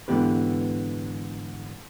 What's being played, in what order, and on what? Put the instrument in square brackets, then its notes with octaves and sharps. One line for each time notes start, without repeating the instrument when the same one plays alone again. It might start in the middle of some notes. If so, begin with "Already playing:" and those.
[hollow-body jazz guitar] G#2 D3 E3 B3 G4 B4